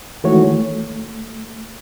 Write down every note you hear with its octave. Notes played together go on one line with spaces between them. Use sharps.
D#3 E3 G#3 A3 F#4 C#5
A3